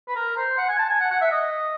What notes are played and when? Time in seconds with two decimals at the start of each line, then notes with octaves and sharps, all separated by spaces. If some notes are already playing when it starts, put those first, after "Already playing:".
0.08 B4
0.16 A#4
0.37 C5
0.58 F#5
0.69 G#5
0.79 A5
0.90 G#5
1.00 F#5
1.11 F#5
1.21 E5
1.31 D#5